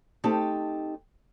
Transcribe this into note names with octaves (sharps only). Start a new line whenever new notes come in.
A3 C4 D#4 G4 A5